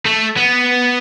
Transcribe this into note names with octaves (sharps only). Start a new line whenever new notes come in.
A3
B3